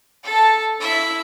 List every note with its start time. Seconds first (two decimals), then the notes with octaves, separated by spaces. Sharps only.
0.24 A4 A5
0.80 E4 E5